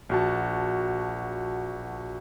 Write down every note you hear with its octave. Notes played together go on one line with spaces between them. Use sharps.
A#1 F#4 A5